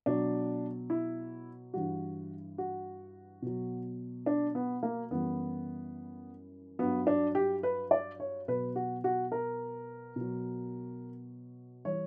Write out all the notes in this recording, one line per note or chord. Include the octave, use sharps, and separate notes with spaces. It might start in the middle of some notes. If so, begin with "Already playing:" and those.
B2 F#3 D4
E4
G2 E3 G3 F#4
F#4
B2 F#3
D4
B3
A#3
F#2 E3 G3 B3
G2 F#3 B3
D4
G4
B4
D5
C#5
B2 F#3 B4
F#4
F#4
A#4
B2 F#3
E3 G3 C#5